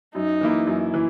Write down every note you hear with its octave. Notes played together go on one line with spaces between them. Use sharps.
F#2 D#4
E3 A#3 E4
F#2
E3